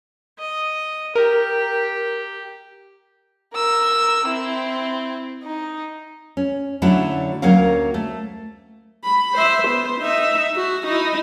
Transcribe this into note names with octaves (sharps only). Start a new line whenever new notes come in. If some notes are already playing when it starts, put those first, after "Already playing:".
D#5
G4 A#4
A#4 E6
C4 E4
D#4
C#4
D3 F#3 A3 C#4 E4
D2 F#3 A#3 C#4 A#4 F5
A3
B5
C5 E5
B3 C5
D#4 E5
F#4
D#4 E4